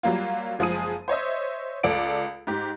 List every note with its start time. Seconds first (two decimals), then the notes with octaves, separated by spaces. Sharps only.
0.03 F#3 G3 A#3 F4
0.59 F#1 F3 G#3 G#4 D#6 D#7
1.08 C5 C#5 D#5 E5
1.83 C#2 A4 D5 D7
2.47 G#2 G4